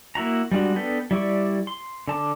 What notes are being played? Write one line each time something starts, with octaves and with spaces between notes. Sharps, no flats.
A#3 E4 F#4 A#5
G3 G#3 D4 F#4
B3 D4 A4 B4 G5
G3 E4 D5 C#6
C6
D3 A5 D6